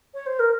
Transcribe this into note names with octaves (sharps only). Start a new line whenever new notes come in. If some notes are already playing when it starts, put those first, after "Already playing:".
C#5
C5
A#4